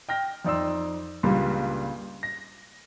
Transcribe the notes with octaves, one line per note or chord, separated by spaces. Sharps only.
G5 F6 A#6
F2 D#4 D5 C6 E6
C#2 G2 A#2 G3 A#3
A#6